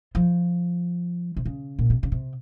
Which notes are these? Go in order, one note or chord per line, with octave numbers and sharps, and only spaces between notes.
F3
C3
C#3
A#2
C3
C#3
C3